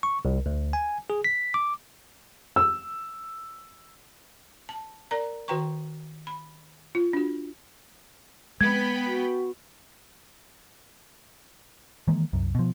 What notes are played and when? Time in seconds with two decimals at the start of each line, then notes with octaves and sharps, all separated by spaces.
0.03 C#6
0.25 C2
0.46 D2
0.73 G#5
1.10 G#4
1.24 B6
1.54 D6
2.56 E6
4.69 A5
5.11 A#4 D5 A#5
5.48 D#3 F#4 B4 G5 A#5 C#6
6.27 B5
6.95 F4
7.13 D4 F#4
8.61 G#3 B3 G5 B5 G#6
9.07 F#4
12.08 D#3 E3 G#3 A#3
12.33 C2 F#2
12.55 B2 F3